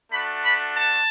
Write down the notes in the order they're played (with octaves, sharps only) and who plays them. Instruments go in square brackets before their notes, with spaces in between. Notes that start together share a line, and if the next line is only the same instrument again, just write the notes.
[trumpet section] A3 D4 F#4 B5
B5
A5